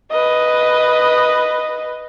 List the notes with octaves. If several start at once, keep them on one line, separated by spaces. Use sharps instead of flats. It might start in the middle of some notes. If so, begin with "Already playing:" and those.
B4 D#5